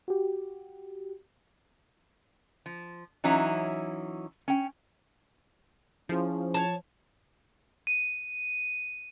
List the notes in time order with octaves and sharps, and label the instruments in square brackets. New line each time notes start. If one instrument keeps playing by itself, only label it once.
[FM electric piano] F#4 G4
[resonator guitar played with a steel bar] F3
E3 F#3 C#4 D#4 E4
C#4 G5
[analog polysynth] F3 [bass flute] C#4 [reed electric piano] E4 G#4
[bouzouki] C#5 A5
[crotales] D#7